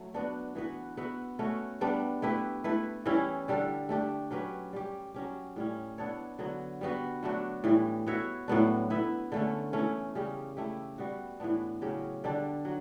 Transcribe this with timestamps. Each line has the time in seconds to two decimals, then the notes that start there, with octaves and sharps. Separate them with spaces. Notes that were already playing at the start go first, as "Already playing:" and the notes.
Already playing: F#3 A3
0.14 B3 D4 F#4
0.55 E3 B3 F#4 B4
0.97 B3 F#4 B4 E5
1.39 A3 C#4 F#4
1.81 G3 B3 D4
2.22 A3 E4 G4 B4
2.64 A3 E4 B4
3.06 E3 G3 C#4 E4
3.48 D3 G3 D4 A4
3.89 A3 D4 G4
4.31 F#3 C#4 G4 B4
4.73 G3 C#4 G4
5.14 F#3 C#4 G4
5.56 A2 G3 C#4
5.98 B3 D4 A4 C#5
6.39 D3 F#3 B3
6.81 G3 B3 F#4 B4
7.23 F#3 A3 D4 F#4
7.64 A2 E3 G3
8.07 B3 F#4 C#5 E5
8.48 A2 F#3 B3 D4
8.90 B3 E4 B4 E5
9.32 D3 A3 C#4
9.73 E3 A3 C#4
10.15 C#3 G3 C#4 G4
10.57 A3 E4 G4
10.98 G3 B3 F#4
11.40 A2 E3 B3 D4
11.82 C#3 F#3 C#4 G4
12.24 D3 G3 D4
12.65 F#3